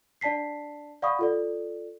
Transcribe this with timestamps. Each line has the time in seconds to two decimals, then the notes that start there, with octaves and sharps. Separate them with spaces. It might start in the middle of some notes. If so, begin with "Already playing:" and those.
0.21 D4 D5 A5 B6 C7
1.02 D5 F5 F#5 B5 C#6 D#6
1.19 F4 A4 D5